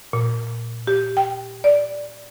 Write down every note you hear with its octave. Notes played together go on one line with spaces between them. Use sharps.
A#2
G4
G5
D5